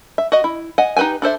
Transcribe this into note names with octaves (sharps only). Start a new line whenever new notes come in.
E5
F#4 D#5
E4
D#5 F#5 G#5
D#4 G4 B4 G5 G#5
D4 A4 C5 E5